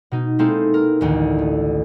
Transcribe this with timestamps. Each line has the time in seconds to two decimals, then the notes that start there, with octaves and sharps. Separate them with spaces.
0.12 B2 D#4
0.39 G#3 A#3 C4 D#4 E4 A4
0.74 A#4
1.01 A1 D2 D#3
1.39 A3